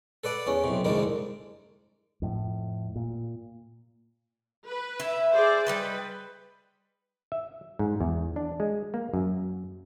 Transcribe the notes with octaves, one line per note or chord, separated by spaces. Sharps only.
A4 B4 D5 F#5
E2 C#4
B1 C3
C2 F2 G#2 D3 A#3
F2 A2
A#2
B4
E4
G#4 C5 D5
G3 D#4 B4 C5
E5
G#2
E2
D4
G#3
A#3
F#2